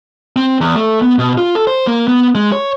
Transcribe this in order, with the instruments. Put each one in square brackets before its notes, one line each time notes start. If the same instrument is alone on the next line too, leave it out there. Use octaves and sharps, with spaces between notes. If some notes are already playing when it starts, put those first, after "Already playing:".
[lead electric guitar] C4
E2
A3
B3
B2
F4
A4
C5
A#3
B3
G#3
C#5